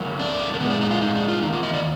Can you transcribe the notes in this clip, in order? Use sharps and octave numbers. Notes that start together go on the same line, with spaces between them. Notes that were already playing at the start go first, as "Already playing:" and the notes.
Already playing: D3 F#3 A#3
D4
A#3
A#2 G#3 B3
D4
D#4
F4
D#4
D4
F4
D#3 A#3 D#4
F4
D#5
D5